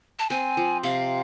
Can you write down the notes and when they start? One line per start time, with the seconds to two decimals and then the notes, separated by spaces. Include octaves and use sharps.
0.19 A5
0.30 C4 G#5
0.57 F3
0.83 C3 F5